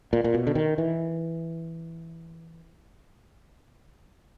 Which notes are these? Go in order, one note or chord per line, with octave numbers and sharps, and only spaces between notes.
A#2
A#2
B2
D3
D#3
E3